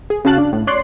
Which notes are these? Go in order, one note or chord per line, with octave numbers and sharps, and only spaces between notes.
G#4
C#3 C#4 F#4 F5 A5 F#6
D4
A2
C#5 D5 C6 F#6 C7